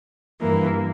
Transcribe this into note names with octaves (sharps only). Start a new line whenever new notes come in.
G2 E3 A#3